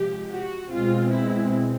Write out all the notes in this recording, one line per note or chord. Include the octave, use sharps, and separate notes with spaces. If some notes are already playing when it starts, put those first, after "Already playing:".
Already playing: C3 F3 G#3 G4
F#4
B2 G#3 C4 F4
E4